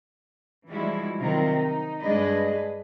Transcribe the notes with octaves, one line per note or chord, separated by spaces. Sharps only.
E3 F3 G3 G#3 E4 F#4
C3 D#3 F#3 C4 F4 A#4
D#4
G2 G#3 D4 G#4 B4 D#5